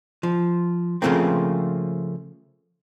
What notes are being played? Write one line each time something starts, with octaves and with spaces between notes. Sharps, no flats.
F3
C#3 F3 A3 A#3 C4